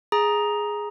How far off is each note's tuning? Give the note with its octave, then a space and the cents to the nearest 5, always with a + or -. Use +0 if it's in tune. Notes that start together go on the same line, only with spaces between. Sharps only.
G#4 +0 A#5 +10